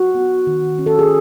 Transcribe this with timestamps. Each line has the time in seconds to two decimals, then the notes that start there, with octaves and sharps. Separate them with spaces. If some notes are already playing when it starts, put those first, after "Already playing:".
Already playing: F#4
0.15 B3
0.47 D#3
0.78 C#4
0.86 A4
0.99 G#4